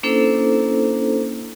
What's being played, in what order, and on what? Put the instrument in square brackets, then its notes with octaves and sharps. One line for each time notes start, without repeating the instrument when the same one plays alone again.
[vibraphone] A#3 C#4 D4 E4 A4 C5